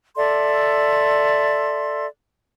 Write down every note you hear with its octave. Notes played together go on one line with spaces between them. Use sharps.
A4 D5 E5 C6